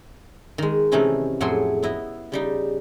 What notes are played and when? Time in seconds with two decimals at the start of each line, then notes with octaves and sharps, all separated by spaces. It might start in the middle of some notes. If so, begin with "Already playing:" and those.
0.58 D#3 G#3
0.92 C3 E3 A3 C#4 D#4 E4
1.41 F2 A2 F#3 G#4 E5 C6
1.83 B3 E4 D#5
2.32 C#3 G3 D#4